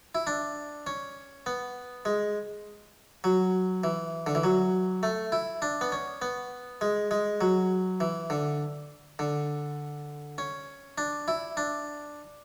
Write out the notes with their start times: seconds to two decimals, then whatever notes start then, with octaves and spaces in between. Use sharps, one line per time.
0.15 E4
0.27 D4
0.87 C#4
1.46 B3
2.05 G#3
3.24 F#3
3.84 E3
4.27 D3
4.35 E3
4.44 F#3
5.03 A3
5.32 E4
5.62 D4
5.81 B3
5.92 C#4
6.22 B3
6.81 G#3
7.11 G#3
7.41 F#3
8.00 E3
8.30 D3
9.19 D3
10.38 C#4
10.98 D4
11.28 E4
11.57 D4